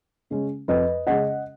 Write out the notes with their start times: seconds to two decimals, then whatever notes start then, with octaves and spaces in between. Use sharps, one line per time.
0.30 C#3 G#3 C#4
0.68 F2 B4 D#5
1.07 C#3 G#3 C#4 D#5 F#5